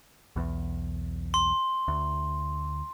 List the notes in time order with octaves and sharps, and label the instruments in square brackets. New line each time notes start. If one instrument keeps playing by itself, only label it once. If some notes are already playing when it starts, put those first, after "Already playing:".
[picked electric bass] B1 E2
[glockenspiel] C6
[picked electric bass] D2